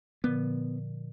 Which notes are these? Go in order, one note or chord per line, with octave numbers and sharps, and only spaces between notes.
A#2 D3 F3 B3